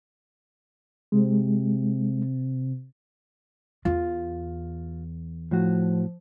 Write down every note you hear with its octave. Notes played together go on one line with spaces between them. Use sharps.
C3 G#3
E2 F4
A2 F3 F#4